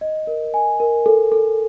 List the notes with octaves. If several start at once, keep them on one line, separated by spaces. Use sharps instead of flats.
D#5
A#4
G#5
A#4
A4
A4